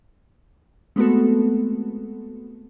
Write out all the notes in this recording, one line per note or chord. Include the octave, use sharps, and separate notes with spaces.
G#3 A3 B3 C4 F#4 A4